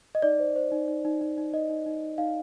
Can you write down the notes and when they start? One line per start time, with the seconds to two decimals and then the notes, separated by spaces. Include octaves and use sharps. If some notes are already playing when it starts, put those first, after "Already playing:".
0.15 D#5
0.22 D#4 D5
0.39 C5
0.56 C5
0.72 D#4
0.88 D#4
1.05 D#4
1.21 D#4
1.38 D#4
1.53 D#4 D#5
1.70 D#4
1.86 D#4
2.03 D#4
2.18 D#4 F5